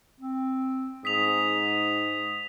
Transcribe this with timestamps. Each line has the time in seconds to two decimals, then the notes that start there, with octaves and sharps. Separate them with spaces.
0.20 C4
1.05 G#2 D#6 B6 F7